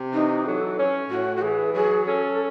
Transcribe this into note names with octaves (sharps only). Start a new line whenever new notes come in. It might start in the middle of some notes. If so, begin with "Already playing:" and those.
Already playing: C3
E3 D#4
F#3 A4
C#4
A2 F#4
F#4
E3 G#4
F#3 G#4
C#4 A4